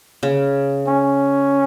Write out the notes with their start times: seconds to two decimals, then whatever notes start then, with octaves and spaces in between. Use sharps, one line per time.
0.23 C#3
0.87 C#4